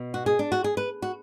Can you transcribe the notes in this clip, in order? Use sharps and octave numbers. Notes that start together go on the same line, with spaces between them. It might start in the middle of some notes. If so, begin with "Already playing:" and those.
Already playing: B2
F#4
G#4
D4
F#4
G#4
B4
F#4